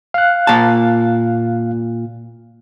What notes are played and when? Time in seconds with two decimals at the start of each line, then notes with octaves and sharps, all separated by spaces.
0.14 F5 F#6
0.47 A#2 A5